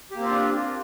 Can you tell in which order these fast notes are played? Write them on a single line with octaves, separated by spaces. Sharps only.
G4 A#3 C4 F4 D4